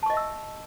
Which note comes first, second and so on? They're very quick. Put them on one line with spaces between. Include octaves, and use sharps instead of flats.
A5 C#6 D#5 E5 E6